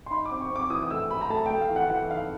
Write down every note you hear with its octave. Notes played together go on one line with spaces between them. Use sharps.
C6
D#4 B5
D6
C4
C#6
C4 D6
E3 D#6
D#6
A3 E6
A3 B5
A#5
A3 A5
G5
A3
F5
E3
F#5
E3 F#5
D#4 F5